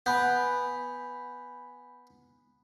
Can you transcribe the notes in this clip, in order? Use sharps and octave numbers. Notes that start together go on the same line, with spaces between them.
B3 G#5 B5 G6